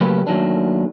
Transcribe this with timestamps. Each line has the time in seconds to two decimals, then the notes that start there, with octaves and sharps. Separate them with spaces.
0.01 C#3 F#3 A3 A#3 G4 B4
0.27 D#2 D#3 F#3 A3 D4